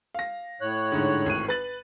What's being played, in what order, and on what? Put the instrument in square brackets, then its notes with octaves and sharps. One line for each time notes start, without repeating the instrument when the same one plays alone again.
[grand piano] F5 A#6
[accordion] A2 C#5 F#6
[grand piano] G#2 D3
G#1 D#7
B4 A6 F#7